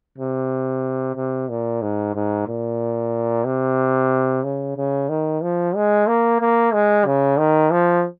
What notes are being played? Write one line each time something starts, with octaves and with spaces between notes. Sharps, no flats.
C3
C3
A#2
G#2
G#2
A#2
C3
C#3
C#3
D#3
F3
G#3
A#3
A#3
G#3
C#3
D#3
F3